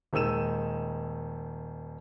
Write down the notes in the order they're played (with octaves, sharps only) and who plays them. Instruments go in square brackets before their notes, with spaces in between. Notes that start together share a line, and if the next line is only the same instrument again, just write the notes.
[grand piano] D#1 D#3 G#3 E6 D#7 E7